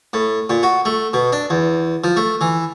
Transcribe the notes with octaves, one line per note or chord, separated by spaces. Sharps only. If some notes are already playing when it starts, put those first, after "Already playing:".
A2
A#2
F#4
A3
B2
D4
E2
F3
A3
E3